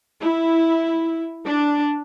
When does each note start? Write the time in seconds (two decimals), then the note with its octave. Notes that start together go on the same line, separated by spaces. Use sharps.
0.21 E4
1.45 D4